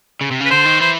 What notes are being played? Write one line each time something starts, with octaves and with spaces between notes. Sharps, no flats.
C#3
C3
C#3
B4
D3 C5
D#3
E3 C5